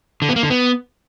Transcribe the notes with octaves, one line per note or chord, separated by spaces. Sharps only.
D3
B3
A#3
D3
B3